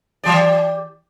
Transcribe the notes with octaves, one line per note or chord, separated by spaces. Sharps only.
E3 G4 D5